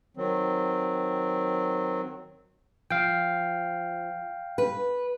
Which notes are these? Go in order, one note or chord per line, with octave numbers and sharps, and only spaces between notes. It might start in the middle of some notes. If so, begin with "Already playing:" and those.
D#3 F#3 C4
F3 F5 G5
B4